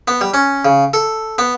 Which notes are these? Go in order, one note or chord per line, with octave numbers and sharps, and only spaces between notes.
B3
G3
C#4
C#3
A4
B3